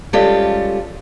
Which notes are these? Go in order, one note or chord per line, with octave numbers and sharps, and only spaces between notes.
G3 G#3 C#4 F4 G4 A4